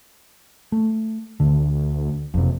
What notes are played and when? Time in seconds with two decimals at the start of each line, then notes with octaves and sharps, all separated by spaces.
0.72 A3
1.40 D2 D3
2.34 F#1 F2 C3